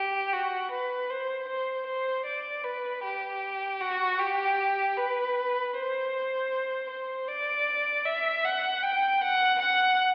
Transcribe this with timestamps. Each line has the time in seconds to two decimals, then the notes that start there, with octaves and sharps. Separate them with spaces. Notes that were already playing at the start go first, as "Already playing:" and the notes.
Already playing: G4
0.33 F#4
0.72 B4
1.10 C5
1.49 C5
1.87 C5
2.26 D5
2.64 B4
3.04 G4
3.80 F#4
4.19 G4
4.97 B4
5.74 C5
6.90 C5
7.28 D5
8.06 E5
8.45 F#5
8.83 G5
9.21 F#5
9.60 F#5